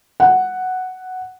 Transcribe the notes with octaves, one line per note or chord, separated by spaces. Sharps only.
F#5